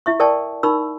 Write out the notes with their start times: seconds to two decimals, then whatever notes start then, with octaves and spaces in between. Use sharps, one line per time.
0.06 E4 E5 C#6
0.20 A4 A#4 D5 G5 A5 C#6
0.63 D#4 A#4 B5 C#6 E6